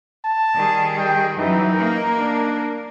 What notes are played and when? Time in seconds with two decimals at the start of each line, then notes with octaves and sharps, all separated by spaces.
0.25 A5
0.54 D#3 G3 G#4
0.98 G5
1.38 F#2 E3 F#3 D#4
1.74 A#3 A#4
2.18 D4